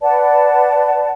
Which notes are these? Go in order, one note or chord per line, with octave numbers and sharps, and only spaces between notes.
B4 D5 F#5 A5